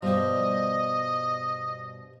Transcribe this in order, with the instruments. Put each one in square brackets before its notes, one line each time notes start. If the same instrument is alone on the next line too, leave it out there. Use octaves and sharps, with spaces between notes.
[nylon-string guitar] G2 B2 G3 [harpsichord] F3 G4 [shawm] D#5